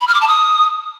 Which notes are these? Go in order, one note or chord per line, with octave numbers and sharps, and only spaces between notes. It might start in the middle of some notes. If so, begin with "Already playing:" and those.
B5
F6
D6
A5
D#6